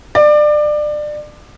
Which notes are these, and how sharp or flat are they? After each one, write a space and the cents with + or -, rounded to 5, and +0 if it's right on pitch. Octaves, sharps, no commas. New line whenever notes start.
D5 +25